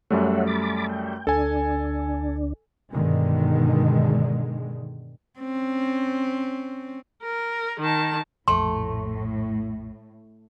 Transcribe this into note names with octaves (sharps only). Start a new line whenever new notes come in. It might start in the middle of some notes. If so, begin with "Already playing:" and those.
F#2 G3 A3 C#5 E5 F#5
B5 D6 A6
G5
D2 D4 A4 G#5
G2 B2 D3 D#3 G#3
C4 C#4
A#4
D#3 A5
A#1 F2 A2 A3 C6